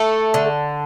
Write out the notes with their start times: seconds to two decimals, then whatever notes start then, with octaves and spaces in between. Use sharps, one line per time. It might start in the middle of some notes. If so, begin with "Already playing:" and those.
Already playing: A3 A4
0.34 D3